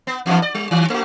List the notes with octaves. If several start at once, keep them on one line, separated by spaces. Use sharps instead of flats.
B3
E2 G2 E3
D5
G3
D#3 G3
A3 F#4